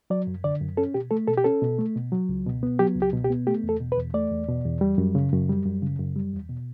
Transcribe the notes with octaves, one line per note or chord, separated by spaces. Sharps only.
F#3 D5
F#2
D3 D5
F#2
C#4 A4
B2 G4
A3 A4
B2 A4
G4
C#4 A4
B2
A3
B2
F#3
C#2
B2
B3
F#3 G4
C#2
G4
B2
G4
B3
A3 G4
E2
A4
B2
B4
E2
A3 D5
E2
B2
E2
G3
F#2
C#3
F#2
G3
F#2
C#3
F#2
G3
E2
B2